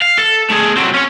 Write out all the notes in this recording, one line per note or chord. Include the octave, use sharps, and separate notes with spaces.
F5
A4
A3 G#4
F#3 C4
C#4 C#5